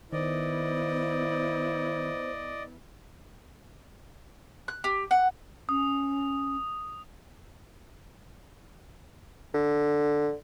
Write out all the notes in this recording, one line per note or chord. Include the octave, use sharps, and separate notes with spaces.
D#3 B3 E4 C5 D5 D#5
F#6
G4
F#5
C#4 D#6
D3